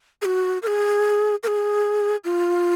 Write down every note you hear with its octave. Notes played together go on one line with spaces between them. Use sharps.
G#4
F#4
A#4
G#4
A#4
G#4
F4